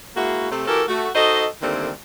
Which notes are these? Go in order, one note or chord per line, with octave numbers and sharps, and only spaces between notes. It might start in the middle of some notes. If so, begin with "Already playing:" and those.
G#3 A#3 E4 F#4
C3 A3 C4
E3 F#4 G4 A4 A#4
A3 F#4
D#4 F#4 A4 C5 D#5
D3 D#3 G3 A3 A#3 C4